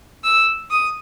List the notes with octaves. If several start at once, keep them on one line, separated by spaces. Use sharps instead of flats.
E6
D#6